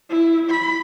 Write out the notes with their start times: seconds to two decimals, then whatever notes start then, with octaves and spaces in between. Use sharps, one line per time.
0.10 E4
0.50 B5